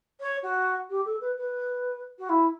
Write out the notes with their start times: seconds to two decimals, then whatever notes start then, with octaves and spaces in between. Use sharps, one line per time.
0.20 C#5
0.43 F#4
0.90 G4
1.05 A4
1.21 B4
1.37 B4
2.19 F#4
2.29 E4